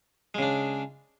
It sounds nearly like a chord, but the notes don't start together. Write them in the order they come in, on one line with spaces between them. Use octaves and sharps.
G#3 C#3 D4